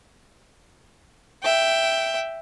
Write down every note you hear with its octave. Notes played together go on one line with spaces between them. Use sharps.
E5 G5